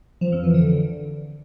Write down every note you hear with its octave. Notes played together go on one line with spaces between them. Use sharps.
F3
F2
E3
D3